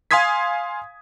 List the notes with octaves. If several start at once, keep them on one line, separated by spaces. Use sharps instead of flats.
F5 G#5 C6 D#6 G#6 B6